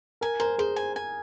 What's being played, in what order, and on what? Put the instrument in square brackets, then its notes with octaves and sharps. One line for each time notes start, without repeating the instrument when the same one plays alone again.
[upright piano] A#4 [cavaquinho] G#5
[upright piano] A#4 [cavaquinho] C5
[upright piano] G#4 [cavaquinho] C5
[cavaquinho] G#5
G#5